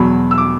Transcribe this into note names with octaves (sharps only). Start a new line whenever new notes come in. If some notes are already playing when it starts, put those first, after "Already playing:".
Already playing: E2 B2 F#3 B5
E6
D6